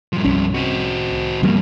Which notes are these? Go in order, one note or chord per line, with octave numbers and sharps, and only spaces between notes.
G2 F3
C2 C#4
C4 F#4
E2 G2 F3 G3 A#3